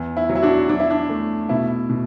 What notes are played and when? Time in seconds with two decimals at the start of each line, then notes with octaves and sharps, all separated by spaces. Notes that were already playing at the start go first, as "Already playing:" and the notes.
Already playing: E2
0.17 E4
0.29 F#3
0.35 E4
0.43 D4 F#4
0.69 F#3 D4
0.80 E4
0.91 D4
1.09 A3
1.49 B2 E4
1.90 B2